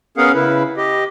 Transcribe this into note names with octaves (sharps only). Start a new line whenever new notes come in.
B3 C#4 G#4 A#4 F5 F#5
C#3 E4 B4
G4 D#5